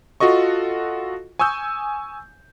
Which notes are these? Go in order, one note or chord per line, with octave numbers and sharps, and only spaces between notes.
F4 F#4 A4 D#5 C#6
G#5 C#6 D#6 E6 G6